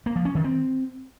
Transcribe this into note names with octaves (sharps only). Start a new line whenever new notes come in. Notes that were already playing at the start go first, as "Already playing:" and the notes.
A#3
F3
C#4
D#3
C4